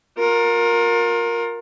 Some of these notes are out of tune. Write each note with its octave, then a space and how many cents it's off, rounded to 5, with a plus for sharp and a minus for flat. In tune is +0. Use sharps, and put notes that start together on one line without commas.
F4 +35 A#4 +0